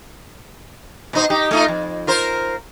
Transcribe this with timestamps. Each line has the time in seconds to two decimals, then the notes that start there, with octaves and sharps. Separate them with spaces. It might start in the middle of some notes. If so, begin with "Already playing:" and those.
1.13 B2 D#4 C5
1.30 D#4 G4
1.51 A3 D#4 F4
1.68 F2
2.07 F4 A#4 C5